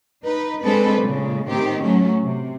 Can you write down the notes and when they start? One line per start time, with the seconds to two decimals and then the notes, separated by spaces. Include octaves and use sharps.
0.24 D#4 B4
0.63 G#3 C4 D4 A4 B4
1.02 A#2 C#3 G#3
1.48 A2 D#3 C4 G4
1.82 F#3 A3 C#4
2.22 C3